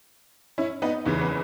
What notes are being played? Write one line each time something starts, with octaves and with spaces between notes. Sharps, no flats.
C#4 E4
B3 D#4
F#1 E2 C#3 E3
B3